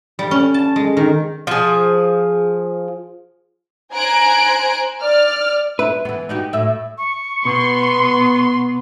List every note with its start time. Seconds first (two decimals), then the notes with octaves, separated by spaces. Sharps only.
0.19 G3
0.31 C#4
0.54 A5
0.76 G#3
0.97 D#3
1.47 F3 G#4
3.93 C5 G#5 A#5 F#6 G#6 D7
5.02 D5 F6
5.79 E4 B4
6.05 E3 B3
6.29 D#4 F#4 G4
6.53 A2 E5
6.98 C#6
7.45 B2 B3 C6